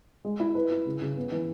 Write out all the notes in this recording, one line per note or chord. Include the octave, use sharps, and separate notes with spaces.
G#3
E4
B4
E4
C#3
C#3
B3
E3